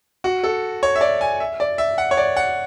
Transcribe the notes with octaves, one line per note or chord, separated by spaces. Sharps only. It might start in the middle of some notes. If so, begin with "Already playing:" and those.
F#4
A4
C#5
E5
D5
G#5
E5
D5
E5
F#5
C#5
D5
F#5